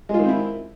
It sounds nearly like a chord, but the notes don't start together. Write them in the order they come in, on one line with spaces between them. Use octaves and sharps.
G#3 F4 D#3 C4 E4